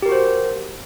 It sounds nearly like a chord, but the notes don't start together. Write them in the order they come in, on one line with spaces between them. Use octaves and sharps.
G4 A#4 F#4 C5